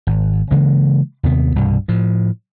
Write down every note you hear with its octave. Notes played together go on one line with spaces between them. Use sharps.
G#1
C#3 E3 G#3 A#3
D#2 C3 B3
C2 G2 B2
A2 F3